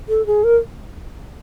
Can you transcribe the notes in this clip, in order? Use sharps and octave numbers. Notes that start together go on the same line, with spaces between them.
A4
G#4
A#4